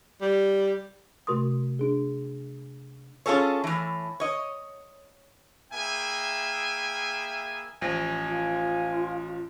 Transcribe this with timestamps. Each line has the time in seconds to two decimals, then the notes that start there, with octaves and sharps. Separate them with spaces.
0.22 G3
1.27 C3 A3 F#4 A#4 C6 D#6
1.79 D4 G#4
3.26 C#4 F4 G#4 A4 C#5
3.64 A2 E3
4.20 C#5 D#5
5.72 A#3 E4 G#4 E5 G5 G#5
7.82 A1 F3 G#5 A#6
8.28 F4